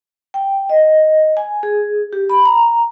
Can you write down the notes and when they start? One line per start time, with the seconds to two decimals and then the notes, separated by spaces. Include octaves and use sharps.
0.34 G5
0.70 D#5
1.37 G#5
1.63 G#4
2.13 G4
2.30 B5
2.46 A#5